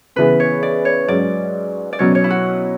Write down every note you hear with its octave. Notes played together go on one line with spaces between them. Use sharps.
C#3 E3 B3 B4
C#5
D5
C#5
G#2 F#3 C#4 D5
D5
B2 F#3 C#4 C#5
C#5
E4
F#4